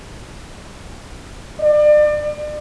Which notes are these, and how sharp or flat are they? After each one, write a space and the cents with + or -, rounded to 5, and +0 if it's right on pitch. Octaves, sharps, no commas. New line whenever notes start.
D5 +35